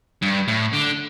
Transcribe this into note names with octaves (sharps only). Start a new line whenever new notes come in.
G2
A2
D3